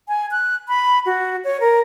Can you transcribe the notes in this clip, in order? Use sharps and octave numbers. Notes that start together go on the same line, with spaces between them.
G#5
F#6
B5
F#4
C#5
A#4